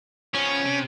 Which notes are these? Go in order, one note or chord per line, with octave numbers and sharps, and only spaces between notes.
F3 B3 C#4
C3